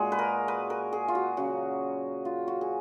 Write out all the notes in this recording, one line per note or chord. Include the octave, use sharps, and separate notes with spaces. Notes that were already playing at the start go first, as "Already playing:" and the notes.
Already playing: A#2 G#3 F#4 G#4
B4
A#4
B4
A#4
G#4
F4
F#4
C#3 F#3 F#4
F4
F#4
G#4